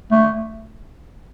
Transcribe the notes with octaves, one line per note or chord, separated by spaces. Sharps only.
A3